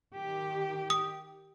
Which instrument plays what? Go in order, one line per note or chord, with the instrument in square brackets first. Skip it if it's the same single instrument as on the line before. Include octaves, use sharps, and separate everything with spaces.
[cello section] D#3 G4
[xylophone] D#6